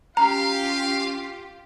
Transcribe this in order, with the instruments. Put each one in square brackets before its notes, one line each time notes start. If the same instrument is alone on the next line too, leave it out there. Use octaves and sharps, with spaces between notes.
[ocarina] C#4 [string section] F4 G4 [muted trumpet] F5 [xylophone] A#5